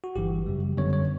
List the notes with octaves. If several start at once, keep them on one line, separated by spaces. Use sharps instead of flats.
F#4
G1 G2 E3 G4
F#2 C#3 G3
F#2 D3 G3 B3 C#5
C#5